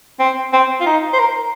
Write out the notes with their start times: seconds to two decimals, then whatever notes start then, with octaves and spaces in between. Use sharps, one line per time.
0.19 C4
0.53 C4
0.80 F4
0.86 D#4
1.13 C5
1.19 A#4